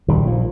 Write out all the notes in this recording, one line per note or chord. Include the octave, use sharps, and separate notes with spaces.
A#1 D#3 G3
A#2 F3